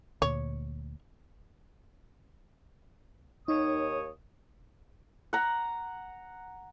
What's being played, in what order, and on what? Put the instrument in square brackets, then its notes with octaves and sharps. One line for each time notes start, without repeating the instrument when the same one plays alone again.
[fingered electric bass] D2 A#2 [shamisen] C#5
[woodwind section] D#2 C#5 D#6 [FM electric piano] D#4
[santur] F#5 A#5